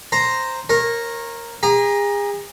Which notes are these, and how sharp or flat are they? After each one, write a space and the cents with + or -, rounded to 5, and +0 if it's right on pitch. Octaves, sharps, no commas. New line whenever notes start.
C5 +0 A#5 +0
A#4 +0 C#5 -30
G#4 -35 A#5 +15